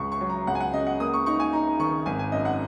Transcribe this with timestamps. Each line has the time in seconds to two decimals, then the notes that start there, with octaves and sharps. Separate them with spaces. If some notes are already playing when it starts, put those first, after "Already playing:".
Already playing: C#2 C#6
0.12 C#6
0.21 F#3
0.30 A#5
0.47 C#2 F#5
0.55 G#5
0.60 F#5
0.73 C#3 D#5
0.87 F#5
1.00 A#3 D#6
1.14 C#6
1.26 D#4 C#6
1.40 G#5
1.53 D#4 A#5
1.79 D#3 C#6
2.06 G#1 G#5
2.19 G#5
2.32 F#2 D#5
2.45 F#5